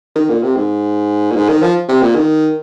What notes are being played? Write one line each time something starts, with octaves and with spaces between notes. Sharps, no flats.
D#3
A#2
C3
G#2
A#2
G#2
D#3
F3
C3
A#2
D#3